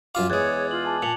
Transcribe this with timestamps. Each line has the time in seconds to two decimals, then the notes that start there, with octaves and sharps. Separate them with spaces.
0.15 F#2 F4 F5 D6
0.30 E2 G#3 C#5 F#6 G#6 A6
0.71 F4 F#7
0.85 G#5 A5 D6
1.02 A#2 A5 C#7 F7 F#7